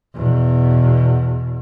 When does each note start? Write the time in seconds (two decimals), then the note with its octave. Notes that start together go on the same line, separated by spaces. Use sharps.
0.15 E2 B2